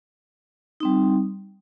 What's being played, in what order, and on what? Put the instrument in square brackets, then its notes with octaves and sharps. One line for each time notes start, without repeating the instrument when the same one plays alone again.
[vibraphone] G3 C4 D#4